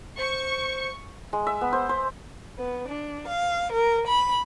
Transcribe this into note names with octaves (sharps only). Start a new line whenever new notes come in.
C5 C#6
G#3
E5
B3
C5
C5
B3
D4
F5
A#4
B5